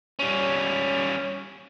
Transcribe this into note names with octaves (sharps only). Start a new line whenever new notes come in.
G3 C#4